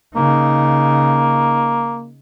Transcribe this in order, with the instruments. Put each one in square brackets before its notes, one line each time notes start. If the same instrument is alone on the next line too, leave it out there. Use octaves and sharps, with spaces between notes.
[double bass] C#3 D#4 [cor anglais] A#3